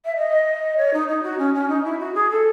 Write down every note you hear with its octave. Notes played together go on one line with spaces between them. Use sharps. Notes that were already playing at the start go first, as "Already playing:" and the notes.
E5
D#5
C#5
D#4
D#4
F#4
C#4
C#4
D#4
E4
F#4
G#4
A4